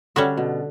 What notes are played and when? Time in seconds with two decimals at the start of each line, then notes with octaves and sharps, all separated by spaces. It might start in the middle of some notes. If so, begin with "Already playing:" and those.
0.16 D3 G3 C#4 F#4 C#5 E5
0.37 B2